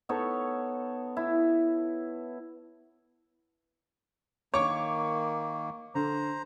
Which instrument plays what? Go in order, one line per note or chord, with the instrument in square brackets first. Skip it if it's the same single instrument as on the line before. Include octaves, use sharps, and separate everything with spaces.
[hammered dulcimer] B3 D#4 A4 C#5
E4
[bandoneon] D#3 A#3 [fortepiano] C#5 [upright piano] C#6 D6
[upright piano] D3 [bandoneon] C5 A#5